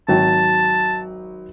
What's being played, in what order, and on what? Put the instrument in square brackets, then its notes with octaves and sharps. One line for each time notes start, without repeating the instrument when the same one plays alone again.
[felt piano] G#1 F#3 G5 [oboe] A5